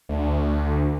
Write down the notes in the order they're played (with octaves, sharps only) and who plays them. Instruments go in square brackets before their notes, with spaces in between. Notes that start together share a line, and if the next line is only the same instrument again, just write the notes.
[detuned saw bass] D2